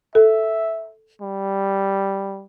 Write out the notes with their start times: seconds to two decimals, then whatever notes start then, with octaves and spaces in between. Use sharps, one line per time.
0.15 A4 E5
1.21 G3